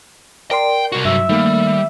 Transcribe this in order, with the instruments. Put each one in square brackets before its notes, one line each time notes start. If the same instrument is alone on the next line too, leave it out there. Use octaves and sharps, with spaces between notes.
[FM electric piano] A#4 D5 C6 [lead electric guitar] G5
[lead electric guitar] C2 F#4
[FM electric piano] G2 F#3 [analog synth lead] E5
[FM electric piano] D#3 A3 A#3 [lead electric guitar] G3